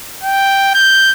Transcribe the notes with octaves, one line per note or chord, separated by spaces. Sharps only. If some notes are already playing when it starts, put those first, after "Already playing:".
G5
G6